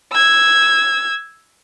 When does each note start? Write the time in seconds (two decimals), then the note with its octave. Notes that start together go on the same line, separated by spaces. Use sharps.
0.12 E6 G#6